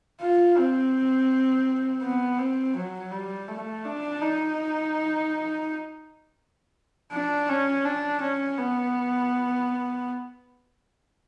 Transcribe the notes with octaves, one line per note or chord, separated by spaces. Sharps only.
F4
C4
B3
C4
F#3
G3
A3
D4
D#4
D4
C#4
D4
C#4
B3